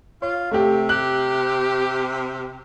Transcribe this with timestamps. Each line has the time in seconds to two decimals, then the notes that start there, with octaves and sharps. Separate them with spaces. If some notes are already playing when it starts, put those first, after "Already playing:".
0.22 F4 C#5
0.51 C3 A3 G4
0.89 G4 F#6